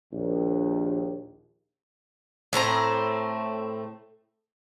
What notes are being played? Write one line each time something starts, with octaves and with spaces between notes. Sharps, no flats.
A#1 D#2
A2 A3 C4 A#5